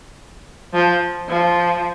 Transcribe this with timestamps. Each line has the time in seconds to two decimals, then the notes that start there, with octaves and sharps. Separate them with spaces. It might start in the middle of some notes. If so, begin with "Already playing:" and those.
0.73 F3
1.29 F3